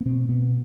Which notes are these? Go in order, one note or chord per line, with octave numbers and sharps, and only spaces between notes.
B3
B2 C4
B2 B3